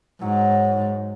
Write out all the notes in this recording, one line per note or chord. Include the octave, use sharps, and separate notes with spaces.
G#2 F#3